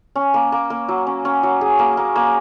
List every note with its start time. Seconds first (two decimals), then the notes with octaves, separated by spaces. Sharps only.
0.16 C#4
0.34 A#3
0.52 A#3
0.70 A#3
0.88 F#3
1.07 C#4
1.25 C#4
1.43 F#3
1.61 G#4
1.79 A#3
1.97 A#3
2.16 A#3